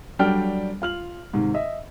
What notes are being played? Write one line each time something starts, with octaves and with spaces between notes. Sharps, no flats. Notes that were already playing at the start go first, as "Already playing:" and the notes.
F#3 G3 D4 A4 G5 F6
F4 F6 F#7
G#2 C3 D#3
D#5 E5